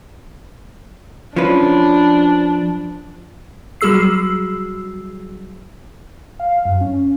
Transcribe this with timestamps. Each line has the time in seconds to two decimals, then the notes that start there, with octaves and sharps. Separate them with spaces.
1.36 F3 C#4 D4 B4
3.81 F#3 G3 F#4 G#4 E6 C7
6.40 F5
6.65 F#2
6.81 C#4